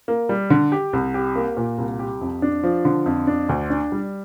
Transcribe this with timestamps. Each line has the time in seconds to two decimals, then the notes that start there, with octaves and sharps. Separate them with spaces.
0.08 A#3
0.29 G3
0.50 D3
0.72 G4
0.93 C2
1.14 G4
1.36 A#3
1.57 A#2
1.78 C2
1.99 G4
2.21 F2
2.42 D4
2.63 F3
2.85 D3
3.06 F2
3.27 D4
3.49 D2
3.70 D4
3.92 G3